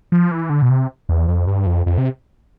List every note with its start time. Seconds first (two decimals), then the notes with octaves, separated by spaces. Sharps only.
0.12 F3
0.31 E3
0.50 D3
0.62 B2
0.70 C3
1.09 E2
1.28 F2
1.47 G2
1.66 F2
1.86 F2
1.98 C3